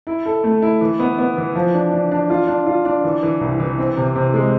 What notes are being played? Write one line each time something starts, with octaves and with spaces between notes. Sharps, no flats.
E4
A4
A3
E4
E3
B3
B3
E3
F3
D4
D4
D4
F4
D4
F4
D4
E3
E3
C2
E3
C4
C3
C3
G#3